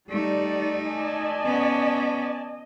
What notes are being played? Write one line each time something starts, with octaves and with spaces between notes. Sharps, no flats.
G3 A3 D#4 D5
D5 D#5 G#5 A5
B3 C#4